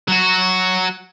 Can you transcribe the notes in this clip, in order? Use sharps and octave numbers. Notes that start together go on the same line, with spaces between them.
F#3 F#4